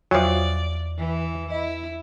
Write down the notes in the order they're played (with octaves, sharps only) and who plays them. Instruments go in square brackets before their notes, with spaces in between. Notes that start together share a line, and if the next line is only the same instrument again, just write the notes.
[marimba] E2 E5 [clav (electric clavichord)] F3 F#3 [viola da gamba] D5
[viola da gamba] E3
[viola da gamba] E4 [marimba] D#5